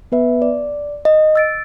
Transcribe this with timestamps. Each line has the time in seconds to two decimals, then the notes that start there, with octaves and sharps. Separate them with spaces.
0.12 B3 B4 E5
0.42 D5
1.05 D#5
1.36 E6 A6 D7